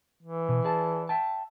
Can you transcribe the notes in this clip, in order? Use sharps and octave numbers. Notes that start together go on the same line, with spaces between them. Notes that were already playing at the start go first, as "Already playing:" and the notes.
E3
B2
G#4 D5 A5
E5 G5 A5